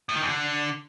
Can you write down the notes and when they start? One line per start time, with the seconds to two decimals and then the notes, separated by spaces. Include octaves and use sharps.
0.09 A2
0.15 D#3
0.22 E2
0.29 D3